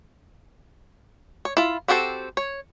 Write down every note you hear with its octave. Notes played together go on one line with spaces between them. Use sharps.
C#5
E4 F4
C4 F#4 G4 A4 C5
C#5